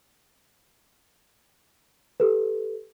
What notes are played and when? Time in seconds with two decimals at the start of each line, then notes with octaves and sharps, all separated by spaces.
2.20 G4 A4 B4